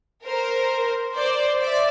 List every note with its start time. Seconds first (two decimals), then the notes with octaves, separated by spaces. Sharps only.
0.24 A#4 C5
1.15 C5 D5
1.60 D5 E5